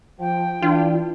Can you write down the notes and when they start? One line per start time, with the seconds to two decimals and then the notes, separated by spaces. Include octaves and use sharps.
0.20 F3 G5
0.62 E3 D4 F4